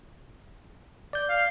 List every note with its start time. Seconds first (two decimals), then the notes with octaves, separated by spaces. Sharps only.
1.13 D5 G6
1.29 F5